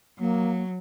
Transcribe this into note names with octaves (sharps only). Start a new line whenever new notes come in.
F#3 A#3